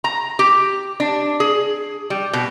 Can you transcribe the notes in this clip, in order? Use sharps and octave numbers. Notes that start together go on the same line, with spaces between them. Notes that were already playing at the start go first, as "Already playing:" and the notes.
A#5
G4
D4
G#4
G3
B2